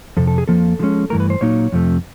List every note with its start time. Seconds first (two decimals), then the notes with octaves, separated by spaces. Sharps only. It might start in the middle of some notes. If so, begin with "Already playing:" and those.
0.17 F2 C3 A4
0.27 A4
0.38 G#4
0.48 F2 C#3 F3 A#3 A4
0.79 D3 F3 G#3 C#4
1.10 G2 E3 A3 A#4
1.20 B4
1.30 C5
1.41 A#2 F#3 A#3 D#4 C#5
1.72 F2 C3 F3 A3